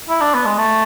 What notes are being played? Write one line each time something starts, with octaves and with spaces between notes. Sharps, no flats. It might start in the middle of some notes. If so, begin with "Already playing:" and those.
E4
D4
B3
G#3
A3